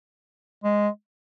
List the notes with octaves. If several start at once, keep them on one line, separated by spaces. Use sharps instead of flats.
G#3